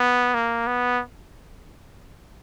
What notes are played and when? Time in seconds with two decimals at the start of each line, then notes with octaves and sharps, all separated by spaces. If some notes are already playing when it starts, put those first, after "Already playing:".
Already playing: B3
0.34 A#3
0.67 B3